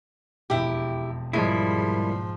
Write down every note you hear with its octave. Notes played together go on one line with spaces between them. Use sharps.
E1 F2 E4 G4
G#2 F3 G3 G#3 A#3 E4